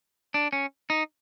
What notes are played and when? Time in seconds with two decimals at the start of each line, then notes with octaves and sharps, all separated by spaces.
0.34 D4
0.53 C#4
0.90 D#4